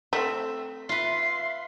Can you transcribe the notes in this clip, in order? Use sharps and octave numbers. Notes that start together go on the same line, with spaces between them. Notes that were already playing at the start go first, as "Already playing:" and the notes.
A3 C4 E5
F4 B4 E5 C6 C7